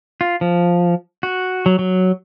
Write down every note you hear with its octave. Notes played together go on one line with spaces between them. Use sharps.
F4
F3
F#4
F#3
F#3